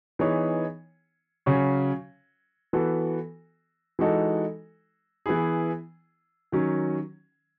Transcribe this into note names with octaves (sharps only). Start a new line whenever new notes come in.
E3 B3 D#4 G#4 C#5
C#3 F#3 C#4 F#4 C#5
E3 B3 F#4 A4
E3 G#3 D#4 F#4 A4
E3 B3 E4 G#4
D#3 F#3 C#4